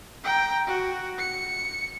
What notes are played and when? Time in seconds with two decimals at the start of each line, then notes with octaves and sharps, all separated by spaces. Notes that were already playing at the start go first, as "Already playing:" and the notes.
0.24 G5 A#5
0.67 F#4
1.19 C#7